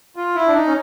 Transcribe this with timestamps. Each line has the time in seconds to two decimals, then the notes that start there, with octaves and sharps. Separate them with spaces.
0.16 F4
0.35 E4
0.48 D4
0.54 D#4
0.67 C#4